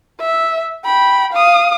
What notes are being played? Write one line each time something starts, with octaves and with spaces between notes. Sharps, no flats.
E5
G5 B5
F5 D#6